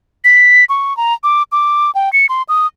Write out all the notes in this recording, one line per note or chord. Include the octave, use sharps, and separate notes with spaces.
B6
C#6
A#5
D6
D6
G5
C#7
C6
D#6